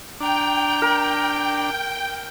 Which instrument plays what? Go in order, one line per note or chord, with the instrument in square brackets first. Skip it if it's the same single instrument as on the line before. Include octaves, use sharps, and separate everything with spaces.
[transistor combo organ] D4 [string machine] G5 [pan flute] A#5
[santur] A#4